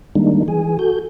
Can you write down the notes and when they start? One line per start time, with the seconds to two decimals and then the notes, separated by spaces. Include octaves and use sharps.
0.15 D#3 G3 G#3 A#3 D4 D#4
0.48 E3 G#4 G#5
0.79 F#4 A4 G6